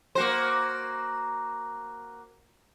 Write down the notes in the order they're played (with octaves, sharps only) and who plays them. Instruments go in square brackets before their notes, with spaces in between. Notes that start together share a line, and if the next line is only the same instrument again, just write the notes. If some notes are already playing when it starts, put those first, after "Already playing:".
[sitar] A#3 F#4 C5